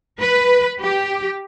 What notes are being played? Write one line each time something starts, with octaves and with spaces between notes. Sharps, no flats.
B4
G4